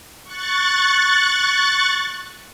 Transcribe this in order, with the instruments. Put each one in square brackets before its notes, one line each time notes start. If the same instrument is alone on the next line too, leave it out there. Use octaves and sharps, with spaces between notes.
[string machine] C#6 F#6 A6